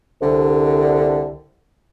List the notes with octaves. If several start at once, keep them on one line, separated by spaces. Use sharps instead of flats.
C2 D3